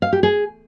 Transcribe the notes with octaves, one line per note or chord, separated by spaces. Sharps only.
F5
G4
G#4